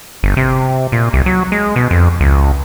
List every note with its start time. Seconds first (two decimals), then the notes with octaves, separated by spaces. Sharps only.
0.23 G1
0.37 C3
0.92 A#2
1.13 C2
1.26 F#3
1.52 G#3
1.76 B2
1.91 F2
2.20 C#2